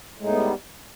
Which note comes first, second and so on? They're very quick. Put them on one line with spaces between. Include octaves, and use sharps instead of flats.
A2 G#3 D#4 B3 G3